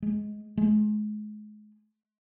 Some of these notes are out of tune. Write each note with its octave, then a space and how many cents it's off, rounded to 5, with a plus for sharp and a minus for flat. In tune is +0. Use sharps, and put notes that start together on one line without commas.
G#3 +10
G#3 +35